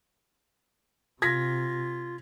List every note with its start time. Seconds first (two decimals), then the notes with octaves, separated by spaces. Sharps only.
1.22 C3 F4 G#6 A#6 B6